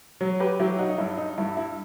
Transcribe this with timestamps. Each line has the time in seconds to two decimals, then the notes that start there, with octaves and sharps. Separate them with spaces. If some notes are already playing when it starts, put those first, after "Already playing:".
0.21 F#3
0.40 G4 B4
0.59 F#3 E4 G4
0.79 D#4 F#4
0.89 D#4
0.98 G2 E4
1.17 D#4
1.38 G2 E4
1.57 E4